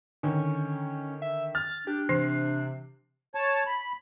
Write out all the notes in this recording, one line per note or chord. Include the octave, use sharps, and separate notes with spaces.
D3 D#3 C#4
E5
F6 A6
D4 G4
C3 E3 C7
C#5 A5
B5